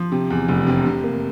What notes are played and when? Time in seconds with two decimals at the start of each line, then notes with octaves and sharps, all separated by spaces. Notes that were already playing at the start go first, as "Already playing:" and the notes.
Already playing: F3
0.12 C3
0.30 E2
0.48 F1
0.67 C3
0.86 C3
1.04 A#3